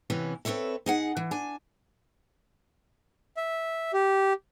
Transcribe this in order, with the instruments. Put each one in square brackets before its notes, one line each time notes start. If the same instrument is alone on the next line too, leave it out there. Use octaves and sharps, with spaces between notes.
[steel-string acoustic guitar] C3 E3 B3 C#4
C4 A4 B4 C#5 E5
D#4 G#4 F#5
E3
D4 G#5
[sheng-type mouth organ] E5
G4